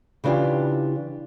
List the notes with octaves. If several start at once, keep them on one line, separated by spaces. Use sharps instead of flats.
C#3 E3 D4 F4 G4